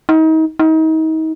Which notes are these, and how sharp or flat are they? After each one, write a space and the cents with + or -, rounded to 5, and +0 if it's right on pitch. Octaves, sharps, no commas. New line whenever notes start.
D#4 +35
D#4 +35